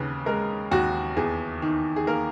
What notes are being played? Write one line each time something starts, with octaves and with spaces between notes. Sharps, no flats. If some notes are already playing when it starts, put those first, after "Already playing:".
Already playing: D#2 C#3 B4
G#3 A#4
D#2 F#4
E2 G#4
D#3
G#4
A#3 A#4